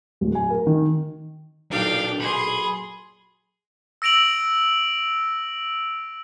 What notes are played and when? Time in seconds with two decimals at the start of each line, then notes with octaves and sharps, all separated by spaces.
0.21 D1
0.35 G#5
0.50 A#4
0.67 D#3
1.72 B1 A#2 D4 D#4 D5 F5 G5
2.20 G#4 B5 C6
4.02 E6 A#6 D7 F7 F#7